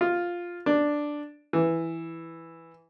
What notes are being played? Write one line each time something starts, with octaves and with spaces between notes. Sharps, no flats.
F4
D4
E3